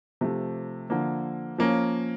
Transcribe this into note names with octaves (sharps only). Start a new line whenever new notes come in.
C3 F3 A3
D3 F3 A#3
F3 A#3 C#4